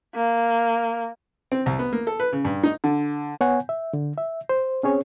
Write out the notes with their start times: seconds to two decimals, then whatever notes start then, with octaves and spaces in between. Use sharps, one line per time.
0.15 A#3
1.52 C4
1.66 C2
1.79 B3
1.93 A#3
2.07 A4
2.20 B4
2.33 C#3
2.45 G2
2.64 D#4
2.84 D3
3.41 B3 C#5 F#5 G#5
3.69 E5
3.93 D3
4.18 E5
4.49 C5
4.83 C4 C#4 G#4 C#5